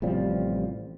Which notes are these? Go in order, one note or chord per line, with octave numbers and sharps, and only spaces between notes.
A1 C3 F3 G3